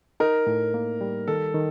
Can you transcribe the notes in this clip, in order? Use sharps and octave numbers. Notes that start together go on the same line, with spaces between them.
D#4 A#4
A2
A#3
G3
D#3 A4
D#3